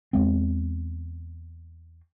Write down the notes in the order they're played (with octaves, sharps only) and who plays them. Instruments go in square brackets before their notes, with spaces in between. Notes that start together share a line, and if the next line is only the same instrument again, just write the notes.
[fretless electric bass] E2 G#3 C4